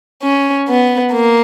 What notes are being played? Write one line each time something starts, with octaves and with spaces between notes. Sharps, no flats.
C#4
B3
A#3